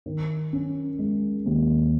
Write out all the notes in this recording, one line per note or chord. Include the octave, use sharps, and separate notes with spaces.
D#3
C#4
G#3
D#2